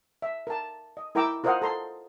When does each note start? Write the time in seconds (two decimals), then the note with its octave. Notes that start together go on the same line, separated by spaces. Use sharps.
0.22 E5
0.47 A#4 A5
0.97 D#5
1.15 E4 A#4 G5 A#5 D6 E6
1.44 F4 A#4 C5 D#5 F5 F#5
1.62 A4 A#5 C6